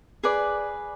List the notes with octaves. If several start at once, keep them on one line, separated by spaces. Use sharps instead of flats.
G#4 B4 D5